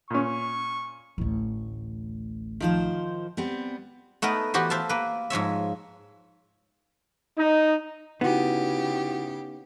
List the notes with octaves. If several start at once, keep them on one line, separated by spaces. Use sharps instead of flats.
A#2 C#4 C#6
A1 D2
D#3 F3 C5
G3 B3 C4
A3 B3 D#4 A#4 B4
E3 B3 F#4 G4 C5
C5 E5 F5 A5
A#3 B4
G#2 F3 C#5 E5
D#4
C#3 B3 D#4 E4 F#4 G4 F#5